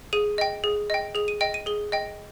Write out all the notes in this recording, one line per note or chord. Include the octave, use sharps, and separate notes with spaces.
G#4 D#7
D#5 G5
G#4
D#5 G5
G#4 F7
D#7
D#5 G5 D7
D#7
G#4 G7
D#5 G5